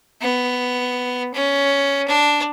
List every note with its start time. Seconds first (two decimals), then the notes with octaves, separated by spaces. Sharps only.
0.22 B3
1.34 C#4
2.08 D4